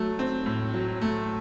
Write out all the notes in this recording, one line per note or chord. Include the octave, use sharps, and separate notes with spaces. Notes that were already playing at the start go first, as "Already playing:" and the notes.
Already playing: F#3 A3
C4
A2
F#3
A3